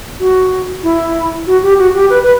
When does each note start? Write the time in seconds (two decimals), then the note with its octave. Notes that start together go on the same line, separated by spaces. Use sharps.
0.20 F#4
0.83 E4
1.47 F#4
1.63 G4
1.78 F#4
1.94 G4
2.10 B4
2.23 B4